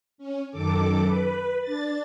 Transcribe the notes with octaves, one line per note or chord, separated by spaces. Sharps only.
C#4
F#2 D#3 A4 D6
B4
D4 A6